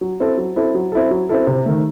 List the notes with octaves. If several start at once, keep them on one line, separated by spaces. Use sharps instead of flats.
F#3
C4 E4 A4
F#3
C4 E4 A4
F#3
C4 E4 A4
F#3
C4 E4 A4
C3
D#3 A3